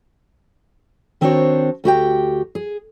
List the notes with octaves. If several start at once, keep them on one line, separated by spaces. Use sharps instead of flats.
D#3 C4 D4 F#4 C5 C#5
D2 F#4 G4 G5
G#4